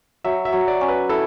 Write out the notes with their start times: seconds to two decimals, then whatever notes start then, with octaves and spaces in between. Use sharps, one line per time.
0.24 F#3 E5
0.45 E5
0.53 F#3
0.68 D5
0.81 C#4
0.88 B4
1.09 E4 A4